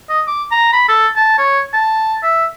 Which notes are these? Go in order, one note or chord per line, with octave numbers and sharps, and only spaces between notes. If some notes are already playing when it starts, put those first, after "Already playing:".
D#5
D6
A#5
B5
A4
A5
C#5
A5
E5